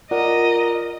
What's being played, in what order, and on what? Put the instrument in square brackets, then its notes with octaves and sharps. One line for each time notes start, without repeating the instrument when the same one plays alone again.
[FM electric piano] F4 D5 F#5 [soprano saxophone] A#4 [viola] D#5